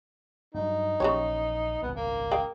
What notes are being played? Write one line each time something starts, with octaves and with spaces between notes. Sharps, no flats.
G2 F#3 D#4
A#1 C#3 E3 G4 C#5
D#1 G#1 C#2 B3
A#3
G#4 F5 G5